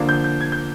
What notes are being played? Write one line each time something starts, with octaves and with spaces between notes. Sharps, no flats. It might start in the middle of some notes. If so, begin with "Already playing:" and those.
Already playing: D3 F3 A#3 D4
G6
G6
G#6
G6